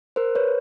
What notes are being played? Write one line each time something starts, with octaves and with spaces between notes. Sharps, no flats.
A#4 C5
B4 C#5